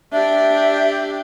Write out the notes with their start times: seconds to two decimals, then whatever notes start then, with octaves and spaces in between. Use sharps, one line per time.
0.12 D4 G4 E5